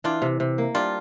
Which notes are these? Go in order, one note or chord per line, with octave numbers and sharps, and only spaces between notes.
E3 D4 F4
C3
C3
A#3
G3 D4 F4